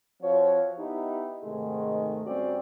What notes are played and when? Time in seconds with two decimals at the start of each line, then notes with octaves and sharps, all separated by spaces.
0.22 F3 C4 F#4 C#5
0.78 B3 D#4 E4 G4
1.44 G#2 C3 D#3 G#3 A3
2.26 G2 C4 C#4 F#4 D5